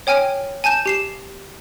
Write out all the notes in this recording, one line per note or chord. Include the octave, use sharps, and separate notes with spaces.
C#5 G5 G#5 F6 D7
G#5 A5 G6 E7
G4 C7 E7